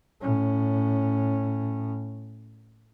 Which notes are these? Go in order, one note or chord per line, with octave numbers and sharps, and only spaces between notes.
A2 C#4